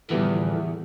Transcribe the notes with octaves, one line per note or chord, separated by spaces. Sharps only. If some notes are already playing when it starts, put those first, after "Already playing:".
E2 A2 D3 F3 G3 B3